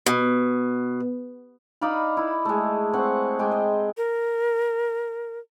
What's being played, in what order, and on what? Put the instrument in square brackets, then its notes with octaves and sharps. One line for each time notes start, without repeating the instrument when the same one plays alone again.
[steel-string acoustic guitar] B2
[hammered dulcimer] D#4 D5 F5 B5
E4
G#3 A3
C4 F#5 C#6
G#3 G5 C6 D6
D#5
[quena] A#4